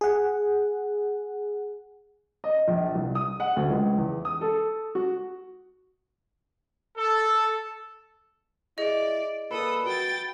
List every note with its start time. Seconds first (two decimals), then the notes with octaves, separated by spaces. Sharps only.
0.01 G#4 F#5
2.44 D#5
2.68 A#1
2.95 C2
3.15 D#6
3.40 F#5
3.56 D2
3.70 C#2
3.98 E2
4.25 D#6
4.41 A4
4.95 F#4
6.98 A4
8.78 E4 G#4 D5 D#5
9.51 A#2 A4 B4 D#6
9.86 F#4 G5 A6